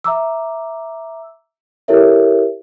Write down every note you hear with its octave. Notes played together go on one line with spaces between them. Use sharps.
E5 A#5 D6 E6
E4 G4 A4 A#4 C#5 E5